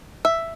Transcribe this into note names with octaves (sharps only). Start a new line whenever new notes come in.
E5